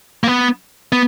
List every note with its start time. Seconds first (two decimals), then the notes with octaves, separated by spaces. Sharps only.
0.24 A#3
0.28 B3
0.92 B3